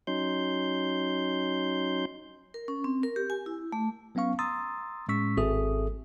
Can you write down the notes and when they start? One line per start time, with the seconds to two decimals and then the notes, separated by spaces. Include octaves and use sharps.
0.07 F#3 C#4 D#4 C6 G6
2.54 A#4
2.68 C#4
2.84 C4
3.03 A#4
3.16 G4
3.30 G#5
3.46 E4
3.72 A3
4.15 F#3 B3 C#4 F5 C#6
4.39 A#5 C6 D#6 E6 A6
5.09 A2 G#3 C#4 C#6 E6 B6
5.37 G#1 C4 G#4 A4 E5 D#6